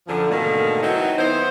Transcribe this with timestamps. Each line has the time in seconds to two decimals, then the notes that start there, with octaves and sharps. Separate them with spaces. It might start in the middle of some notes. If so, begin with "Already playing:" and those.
0.08 F#2 D3 F3
0.30 G#2 B2 D3 D#3 A3 A#3
0.82 E3 F#3 C4 D#4
1.17 D#3 B3 E4 C5